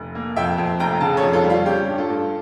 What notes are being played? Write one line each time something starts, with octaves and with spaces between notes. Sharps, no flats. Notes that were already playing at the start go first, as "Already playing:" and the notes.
Already playing: F1
A#3
F2 E5 G5
F2
F1 G5 A#5
C#3 F5 A5
A4 C#5
F2
F4 A4
G3
F4
C#4 G4
G2
F4 A4
G2